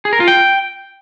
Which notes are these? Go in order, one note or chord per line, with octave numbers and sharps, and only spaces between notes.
G#4
A#4
F4
G5